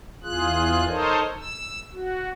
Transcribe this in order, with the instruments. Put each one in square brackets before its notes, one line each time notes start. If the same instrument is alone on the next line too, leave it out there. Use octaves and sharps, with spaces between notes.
[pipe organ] E2 F4 G#4 F#6
D#4 A4 A#4 C5 C#5 D#5
E6
F#4